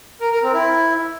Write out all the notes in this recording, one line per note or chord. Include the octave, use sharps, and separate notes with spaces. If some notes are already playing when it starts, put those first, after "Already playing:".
A#4
A#4
C4
E4